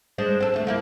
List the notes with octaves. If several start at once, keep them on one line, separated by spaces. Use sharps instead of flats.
G#3 D4 C5
C4 A4
D2 A3
F3 A#3 E4